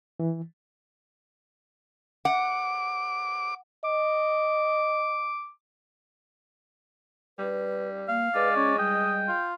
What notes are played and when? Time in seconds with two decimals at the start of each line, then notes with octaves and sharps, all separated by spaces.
0.20 E3
2.25 F#5 D6
3.85 D#5 D6
7.39 G3 B4
8.08 A#3 F5
8.35 G#3 B4 D5
8.56 C#4 C#5
8.79 G3 D#5 G5
9.28 F4